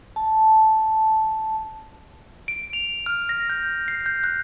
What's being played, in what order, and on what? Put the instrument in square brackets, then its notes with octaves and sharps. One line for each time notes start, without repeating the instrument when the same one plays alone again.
[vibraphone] A5
[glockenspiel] D7
F7
F6
A#6
G6
C7
G6
F#6